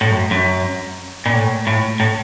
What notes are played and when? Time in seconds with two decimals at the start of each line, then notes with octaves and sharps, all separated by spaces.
0.01 A2
0.11 F#2
0.31 F#2
1.26 A#2
1.33 A2
1.67 A2
2.00 A2